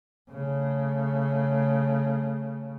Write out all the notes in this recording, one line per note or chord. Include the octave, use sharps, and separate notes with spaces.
C#3 A3